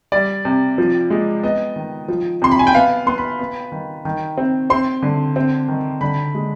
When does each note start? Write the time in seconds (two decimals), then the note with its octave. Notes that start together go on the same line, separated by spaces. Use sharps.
0.12 G3 D5
0.45 C3
0.78 F3
1.10 G#3
1.43 B3 D#5
1.76 D#3
2.08 F3
2.42 C3 C6
2.52 B5
2.59 G#5
2.67 G5
2.75 B3 F5
3.06 B3 C6
3.18 B5
3.39 B3
3.72 D#3
4.05 D#3
4.38 C4
4.70 C4 C6
5.03 D3
5.36 C4
5.68 D#3
6.01 D3 B5
6.35 G#3